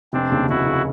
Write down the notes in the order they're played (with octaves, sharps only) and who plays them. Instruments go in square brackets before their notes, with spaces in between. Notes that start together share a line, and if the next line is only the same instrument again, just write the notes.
[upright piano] F1 [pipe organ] C4 D4
[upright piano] D#2 C#3
[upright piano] F1 [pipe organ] E4 F#4
[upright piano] C#3